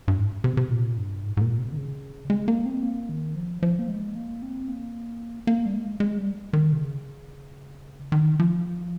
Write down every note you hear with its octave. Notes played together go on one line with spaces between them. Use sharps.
G2
G#2
C3
C3
A#2
G2
G#2
G#2
A#2
C3
D#3
C#3
G#3
A#3
C4
A#3
D#3
F3
F3
A#3
G#3
A#3
C4
A#3
A#3
G3
G#3
G#3
G3
D#3
C3
C#3
D#3
F3